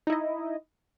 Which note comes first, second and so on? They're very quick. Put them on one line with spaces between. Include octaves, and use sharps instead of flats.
D#4 E4 D#5